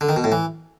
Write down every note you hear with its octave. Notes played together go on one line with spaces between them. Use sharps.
D3
D#3
B2
A2
E3